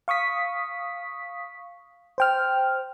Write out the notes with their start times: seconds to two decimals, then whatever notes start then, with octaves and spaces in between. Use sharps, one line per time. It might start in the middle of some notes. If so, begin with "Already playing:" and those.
0.08 F5 C#6 D#6 B6
2.18 C5 G5 F6